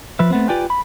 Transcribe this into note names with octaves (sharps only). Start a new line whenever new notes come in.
F3 B4 E5
A3 B3 C4
F4 G4 B4 D5 G5 G#5
B5